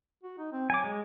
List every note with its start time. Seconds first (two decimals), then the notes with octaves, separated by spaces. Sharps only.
0.23 F#4
0.38 D#4
0.52 C4
0.70 F#3 G#5 D6
0.84 G#3